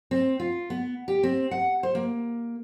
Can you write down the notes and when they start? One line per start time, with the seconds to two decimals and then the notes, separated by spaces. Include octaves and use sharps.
0.11 C4
0.40 F4
0.70 B3
1.08 G4
1.23 C4
1.51 F#5
1.83 C5
1.95 A#3